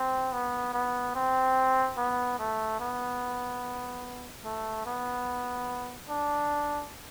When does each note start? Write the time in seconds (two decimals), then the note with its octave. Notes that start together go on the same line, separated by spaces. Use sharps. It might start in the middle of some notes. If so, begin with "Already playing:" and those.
Already playing: C4
0.33 B3
0.74 B3
1.15 C4
1.97 B3
2.39 A3
2.80 B3
4.45 A3
4.86 B3
6.09 D4